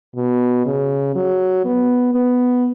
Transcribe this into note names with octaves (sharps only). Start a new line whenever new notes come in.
B2
C#3
F#3
B3
B3